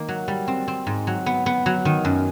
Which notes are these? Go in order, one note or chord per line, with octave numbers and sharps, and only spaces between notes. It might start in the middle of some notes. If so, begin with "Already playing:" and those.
Already playing: D#3 A#3
F#3
G3
C4
C4
G#2
F#3
B3
B3
F#3
D#3
F#2